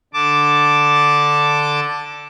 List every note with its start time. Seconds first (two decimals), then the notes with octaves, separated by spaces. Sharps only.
0.14 D3 A5 D6